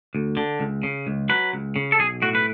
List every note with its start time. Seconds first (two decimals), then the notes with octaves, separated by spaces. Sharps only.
0.15 D2
0.37 D3
0.60 C#2
0.83 C#3
1.07 C#2
1.29 F#3 B4
1.53 C#2
1.76 C#3
1.92 A4
1.99 B1 G#4
2.22 A2 F#4
2.35 B4